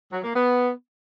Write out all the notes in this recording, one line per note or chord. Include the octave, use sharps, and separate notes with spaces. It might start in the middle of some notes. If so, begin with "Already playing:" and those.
F#3
A#3
B3